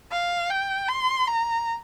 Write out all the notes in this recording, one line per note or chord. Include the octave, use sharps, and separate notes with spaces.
F5
G5
C6
A#5